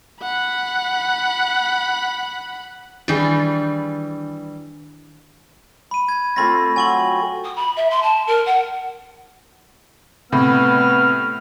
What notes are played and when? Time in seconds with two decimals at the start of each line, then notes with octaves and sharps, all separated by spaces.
0.22 F#5 B5
3.08 D#3 E3 G3 D4 E4 G#4
5.91 B5 D#7
6.09 G#6
6.36 A3 C4 F4 B5 A#6
6.76 F#3 G#5 C#6 F#7
7.44 D#6
7.56 B5
7.76 E5
7.90 C6
8.02 A5
8.27 A#4
8.46 F#5
10.32 A2 C3 B3 F6